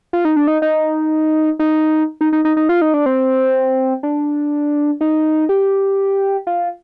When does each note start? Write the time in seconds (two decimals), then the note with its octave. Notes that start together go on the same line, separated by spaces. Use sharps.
0.13 F4
0.25 D#4
0.36 D4
0.48 D#4
0.62 D#4
1.59 D#4
2.21 D#4
2.33 D#4
2.45 D#4
2.57 D#4
2.69 F4
2.81 D#4
2.94 D4
3.06 C4
4.03 D4
5.01 D#4
5.49 G4
6.47 F4